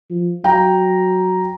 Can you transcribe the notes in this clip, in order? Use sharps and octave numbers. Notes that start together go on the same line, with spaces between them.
F3
F#3 G5 A#5